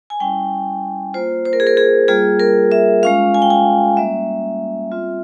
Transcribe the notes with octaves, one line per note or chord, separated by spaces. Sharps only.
G#5
G3 C#4 E4 G5
A#3 F4 C5
C5
A#4
G#4
A#4
G#4
G3 A#3 F4 G#4
A#4
E5
G#3 C#4 F4 F5
G#5
G5
G#5
G3 A#3 C#4 E5
G3 C4 F4